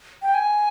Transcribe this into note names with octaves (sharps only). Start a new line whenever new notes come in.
G5
G#5